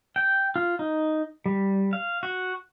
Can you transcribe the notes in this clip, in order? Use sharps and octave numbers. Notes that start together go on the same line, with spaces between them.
G5
F4
D#4
G3
F5
F#4